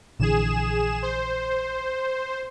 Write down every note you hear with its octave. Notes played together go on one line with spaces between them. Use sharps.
A#1 D3 E3 G#4 E7
C5